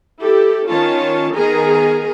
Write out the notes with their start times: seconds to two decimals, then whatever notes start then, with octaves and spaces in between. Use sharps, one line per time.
0.22 E4 G4 A4
0.68 D#3 C#4 F4 C#5 A5
1.35 D#3 B3 G#4 A#4 G#5 A#5